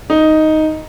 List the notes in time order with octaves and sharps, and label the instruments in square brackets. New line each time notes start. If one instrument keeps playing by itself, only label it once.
[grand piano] D#4